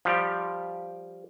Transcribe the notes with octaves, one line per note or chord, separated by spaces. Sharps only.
F3 G3 G4